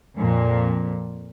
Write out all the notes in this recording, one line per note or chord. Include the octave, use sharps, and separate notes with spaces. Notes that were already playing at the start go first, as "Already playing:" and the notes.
F2 A#2